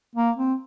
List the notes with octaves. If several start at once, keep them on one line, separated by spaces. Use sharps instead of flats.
A#3
C4